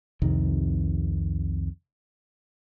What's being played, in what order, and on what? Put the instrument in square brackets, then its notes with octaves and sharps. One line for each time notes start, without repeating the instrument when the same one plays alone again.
[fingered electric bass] C2 F2 C3 D#3